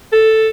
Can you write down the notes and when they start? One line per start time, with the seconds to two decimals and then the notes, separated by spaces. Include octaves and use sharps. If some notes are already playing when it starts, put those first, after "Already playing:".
0.13 A4